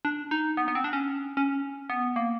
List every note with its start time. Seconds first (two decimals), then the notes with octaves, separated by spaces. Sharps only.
0.05 D4
0.31 D#4
0.57 B3
0.68 B3
0.75 C4
0.84 D4
0.93 C#4
1.37 C#4
1.90 B3
2.16 A#3